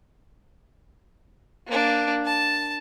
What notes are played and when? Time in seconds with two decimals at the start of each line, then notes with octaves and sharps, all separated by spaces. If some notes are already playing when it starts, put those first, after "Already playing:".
1.67 A#3 D4
2.25 A5